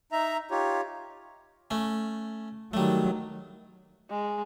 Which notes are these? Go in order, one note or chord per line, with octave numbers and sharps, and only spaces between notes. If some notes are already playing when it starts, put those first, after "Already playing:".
D#4 E5 A#5
D#4 F4 G4 C#5
A3 C#4
D#3 F#3 G3 A3
G#3